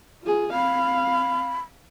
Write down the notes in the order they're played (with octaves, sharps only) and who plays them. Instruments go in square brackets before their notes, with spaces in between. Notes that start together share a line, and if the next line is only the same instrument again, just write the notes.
[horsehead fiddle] F4 G#4
[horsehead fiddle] C4 F5 [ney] B5